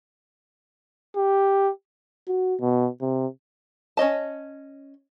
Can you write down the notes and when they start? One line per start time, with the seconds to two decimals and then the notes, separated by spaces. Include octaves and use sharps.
1.16 G4
2.28 F#4
2.61 B2
3.01 C3
3.97 C#4 C#5 D#5 A5